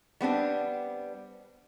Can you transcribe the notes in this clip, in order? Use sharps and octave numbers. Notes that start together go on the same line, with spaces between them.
G3 B3 C4 D4